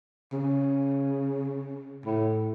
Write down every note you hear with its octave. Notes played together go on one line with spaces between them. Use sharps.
C#3
A2